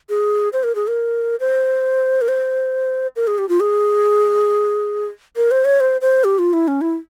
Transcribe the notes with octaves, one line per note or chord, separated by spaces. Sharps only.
G#4
C5
A#4
G#4
A#4
C5
A#4
C5
A#4
G#4
G4
F4
G#4
A#4
C5
C#5
C5
C5
G4
F4
E4
C#4
E4